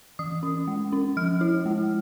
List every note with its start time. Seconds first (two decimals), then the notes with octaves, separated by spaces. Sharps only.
0.19 E3 D#6
0.43 C#4
0.68 G#3
0.92 C#4
1.17 F3 F6
1.41 E4
1.66 G#3